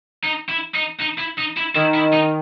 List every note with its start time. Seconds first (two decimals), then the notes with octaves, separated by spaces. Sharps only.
0.24 D#4
0.49 E4
0.74 D#4
0.99 D#4
1.18 E4
1.38 D#4
1.57 E4
1.75 D#3 E4
1.94 E4
2.13 D#4